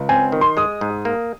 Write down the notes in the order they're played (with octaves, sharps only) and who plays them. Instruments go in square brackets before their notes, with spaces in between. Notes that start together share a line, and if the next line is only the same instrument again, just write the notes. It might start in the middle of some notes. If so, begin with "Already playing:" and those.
Already playing: [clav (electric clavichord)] C#2
[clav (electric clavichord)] C4 [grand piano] G#5
[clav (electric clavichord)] D#3
[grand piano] C6
[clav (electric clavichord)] G#3 [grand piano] D#6
[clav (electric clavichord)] G#2
A#3